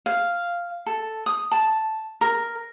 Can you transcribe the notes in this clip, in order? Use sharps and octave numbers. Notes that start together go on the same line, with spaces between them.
F5
A4
D#6
A5
A#4